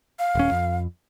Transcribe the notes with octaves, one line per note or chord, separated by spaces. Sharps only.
F5
D#1 C#4
F2